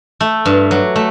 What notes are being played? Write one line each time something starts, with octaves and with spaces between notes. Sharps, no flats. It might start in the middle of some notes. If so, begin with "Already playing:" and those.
A3
G2
F#3
A3